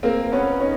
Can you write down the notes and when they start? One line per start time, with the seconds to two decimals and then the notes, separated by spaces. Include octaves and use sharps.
0.03 A#3 C4
0.32 B3 C#4
0.60 C#4 D#4